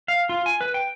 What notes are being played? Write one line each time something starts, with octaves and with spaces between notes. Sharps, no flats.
F5
F4
G#5
B4
G5